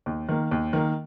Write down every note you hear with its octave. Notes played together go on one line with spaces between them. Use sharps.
D#2
D#3 A#3
D#2
D#3 A#3